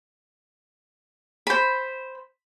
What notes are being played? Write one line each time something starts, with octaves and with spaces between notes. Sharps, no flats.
C5 B5